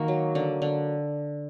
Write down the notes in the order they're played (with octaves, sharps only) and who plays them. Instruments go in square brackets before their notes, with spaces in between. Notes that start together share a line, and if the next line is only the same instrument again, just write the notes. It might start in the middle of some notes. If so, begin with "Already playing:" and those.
Already playing: [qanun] D#3 A#3 F#4
F#3
D3
D3